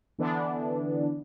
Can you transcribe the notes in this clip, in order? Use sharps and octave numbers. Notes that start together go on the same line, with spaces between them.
D3 E3 B3 D4